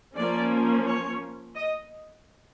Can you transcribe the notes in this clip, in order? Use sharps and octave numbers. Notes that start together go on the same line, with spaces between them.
F3 A#3 C#4 D5
C#5
D#5